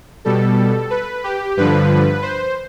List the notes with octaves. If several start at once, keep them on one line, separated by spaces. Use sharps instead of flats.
B2 G3 A4
B4
G4
G2 D3 F3 B4
C5